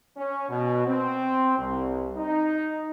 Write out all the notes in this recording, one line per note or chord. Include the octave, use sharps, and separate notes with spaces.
C#4
B2
C4
C2
D#4